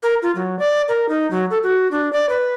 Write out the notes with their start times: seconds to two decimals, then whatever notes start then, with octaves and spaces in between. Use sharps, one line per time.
0.03 A#4
0.22 F4
0.35 F#3
0.59 D5
0.88 A#4
1.09 D#4
1.31 F#3
1.51 A4
1.63 F#4
1.91 D4
2.13 D5
2.29 B4